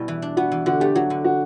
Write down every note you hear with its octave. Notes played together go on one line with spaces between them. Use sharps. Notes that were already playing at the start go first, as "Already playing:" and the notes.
Already playing: B2 G3 B3 E4
E3
D4
B3 F#4
E3
D3 F#4
A3 G4
F#3 F#4
D3
F#4